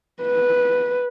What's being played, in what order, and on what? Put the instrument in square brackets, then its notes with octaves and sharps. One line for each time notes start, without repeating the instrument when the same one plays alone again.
[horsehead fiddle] B4